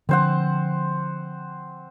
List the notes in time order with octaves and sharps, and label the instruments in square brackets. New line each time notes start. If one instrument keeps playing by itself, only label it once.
[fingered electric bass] D3 F3 [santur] C4 C5 F#5